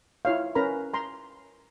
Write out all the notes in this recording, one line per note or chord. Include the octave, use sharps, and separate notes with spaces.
E4 F4 C#5 F5
C#4 A#4 B4 A#5 B5
A#5 C6